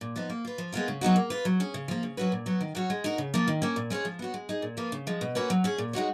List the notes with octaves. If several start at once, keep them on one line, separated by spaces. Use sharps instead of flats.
A#2
F3 B3 D#4
A#3
F4 B4
F3
G#3 B3 F4 A#4
C#3
F#3 B3 D#4 F#4
A#3
F4 B4
F#3
C#4 G#4
C#3
F3 A#3
C#3
F#3 C#4 F#4 B4
A#2
F#3 B3 F#4
D#3
F#3 C#4 F#4 C#5
G#3
D#4 F#4 A#4
C#3
F3 A#3 F4
D#3
A#3 C#4
A#2
G#3 C#4 G#4 C#5
F3
B3 F#4 C#5
G#3
D#4 G#4
A#2
F3 A#3 F4 B4
C#3
F3 G#3
B2
A#3 C#4 F#4 B4
F#3
C#4 G#4
A#2
G#3 D#4 F#4 C#5